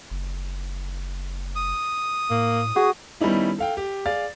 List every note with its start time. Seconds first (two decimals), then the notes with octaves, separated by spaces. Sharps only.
0.10 F#1
1.56 D#6
2.30 A2 A#3
2.76 F#4 G#4
3.21 D#3 G3 B3 C#4 D#4 E4
3.59 A4 F5 G5
3.77 G4
4.05 G#4 D5 F5 A6